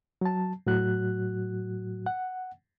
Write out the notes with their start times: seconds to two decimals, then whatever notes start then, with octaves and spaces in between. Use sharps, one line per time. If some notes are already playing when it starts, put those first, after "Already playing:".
0.21 F#3 A5
0.67 A2 F#3 F#4 F#6
2.06 F#5